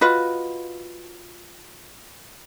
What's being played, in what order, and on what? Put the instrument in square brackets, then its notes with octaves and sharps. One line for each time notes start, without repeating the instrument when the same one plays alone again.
[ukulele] F4 F#4 B4 D#5